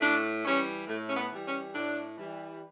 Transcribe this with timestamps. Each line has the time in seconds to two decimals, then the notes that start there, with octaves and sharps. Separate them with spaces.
0.01 A2 D4
0.45 E3 G3 C#4
0.88 A2 A3
1.08 C#4
1.17 B3
1.31 E3 G3
1.46 C#4
1.74 A2 D4
2.17 E3 G3